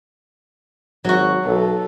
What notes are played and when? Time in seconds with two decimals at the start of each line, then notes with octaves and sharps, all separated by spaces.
1.05 G#1 F#3 F#4
1.46 B1 A4